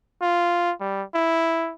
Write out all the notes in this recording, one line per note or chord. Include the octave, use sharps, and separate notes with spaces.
F4
G3
E4